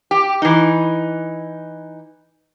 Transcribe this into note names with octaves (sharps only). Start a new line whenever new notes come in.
G4
E3 D#4